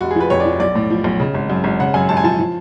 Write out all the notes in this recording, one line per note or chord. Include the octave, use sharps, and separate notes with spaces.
F1 F#4
G#4
F3 B4
F2 C#5
D5
F3
B1 D5
A2
F3
B1
C#3
G#1
F#2
G#1
C#3 F#5
F#2 G#5
G#1 A5
G#5
F3 A5
F3